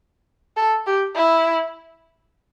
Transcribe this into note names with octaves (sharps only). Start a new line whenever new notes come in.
A4
G4
E4